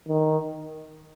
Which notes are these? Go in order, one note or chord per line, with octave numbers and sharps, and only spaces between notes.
D#3